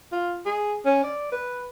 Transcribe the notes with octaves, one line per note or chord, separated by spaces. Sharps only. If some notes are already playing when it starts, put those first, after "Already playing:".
F4
G#4
C#4
D5
B4